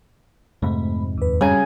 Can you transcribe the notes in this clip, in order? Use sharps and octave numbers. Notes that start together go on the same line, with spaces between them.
F2 G#2 C3 A3 B5
D#2 B4
C#3 G3 C#4 G#5 A#5